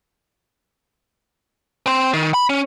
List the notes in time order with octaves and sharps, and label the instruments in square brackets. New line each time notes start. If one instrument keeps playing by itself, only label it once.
[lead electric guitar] C4 C5
D#3
B5
C#4